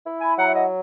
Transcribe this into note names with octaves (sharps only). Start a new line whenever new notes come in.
E4
G#5 B5
F#3 F#5 A#5
E5
D#5 F#5